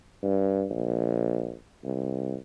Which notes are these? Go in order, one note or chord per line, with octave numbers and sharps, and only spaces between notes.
G2
A#1
C2